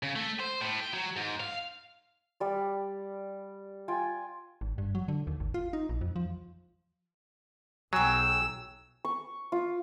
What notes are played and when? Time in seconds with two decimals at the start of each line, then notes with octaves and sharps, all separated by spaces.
0.03 C#3
0.16 A3
0.40 C5
0.61 A2
0.80 G5
0.93 F#3
1.16 G#2
1.40 F5
2.40 G3 D5
3.88 F4 G5 G#5
4.61 G#1
4.78 G2
4.95 F#3
5.08 D3
5.27 D#2
5.40 G#1
5.54 F4
5.73 D#4
5.89 A#1
6.01 F2
6.16 F3
7.93 B1 F#3 G#4 G5 E6
9.05 C#6
9.52 F4